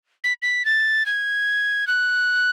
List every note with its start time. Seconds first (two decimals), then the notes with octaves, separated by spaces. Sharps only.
0.24 B6
0.42 B6
0.65 A6
1.06 G#6
1.87 F#6